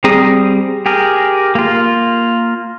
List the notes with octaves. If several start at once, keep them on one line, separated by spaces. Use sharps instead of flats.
G3 C4 G#4 A#5 D#6
G4 G#4 A#4
A#3 F4